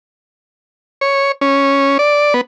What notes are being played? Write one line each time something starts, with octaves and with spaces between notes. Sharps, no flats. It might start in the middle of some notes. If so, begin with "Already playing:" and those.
C#5
C#4
D5
B3